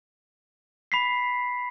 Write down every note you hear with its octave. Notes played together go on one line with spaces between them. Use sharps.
B5 B6 C7